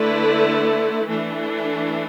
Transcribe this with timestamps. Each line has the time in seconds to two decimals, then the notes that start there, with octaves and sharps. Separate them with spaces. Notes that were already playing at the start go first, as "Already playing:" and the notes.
Already playing: D3 A3 E4 B4 D5
1.07 E3 A3 D4